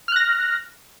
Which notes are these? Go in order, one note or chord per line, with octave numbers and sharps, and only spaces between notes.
F6 F#6 A#6